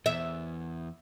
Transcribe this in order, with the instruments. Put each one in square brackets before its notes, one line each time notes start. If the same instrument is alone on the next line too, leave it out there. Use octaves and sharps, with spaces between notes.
[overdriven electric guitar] E2 [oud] E5